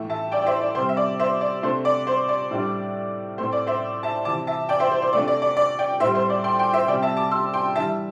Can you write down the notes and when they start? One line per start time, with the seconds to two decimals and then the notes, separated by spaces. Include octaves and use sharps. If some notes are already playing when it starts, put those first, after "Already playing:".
Already playing: A2 E3 A3
0.10 E5 A5
0.32 D5 G5
0.42 D5
0.46 C5 E5
0.62 D5
0.75 C3 G3 C4 C5
0.89 E5
0.97 D5
1.20 C5 E5
1.41 D5
1.63 C3 A3 D4 C5
1.85 D5
2.07 C5
2.28 D5
2.51 A2 G3 D4
3.38 A2 A3 C4 C5
3.52 D5
3.67 C5 E5
4.03 E5 A5
4.25 C3 E3 C4 A5 D6
4.47 E5 A5
4.69 D5 G5
4.80 C5 E5
4.91 C5
5.02 C5
5.13 C3 A3 D4 D5
5.28 D5
5.42 D5
5.57 D5
5.79 D5 G5
6.00 A2 G3 C4 C5 E5
6.15 C5
6.30 D5
6.44 G5 C6
6.59 G5 C6
6.73 C5 E5
6.88 C3 G3 C4 D5 G5
7.02 E5 A5
7.17 A5 D6
7.31 C6 E6
7.53 G5 C6
7.75 E3 G3 D4 E5 A5